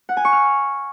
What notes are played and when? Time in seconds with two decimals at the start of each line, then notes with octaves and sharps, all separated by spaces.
0.09 F#5
0.17 G#5
0.25 C#6
0.33 F6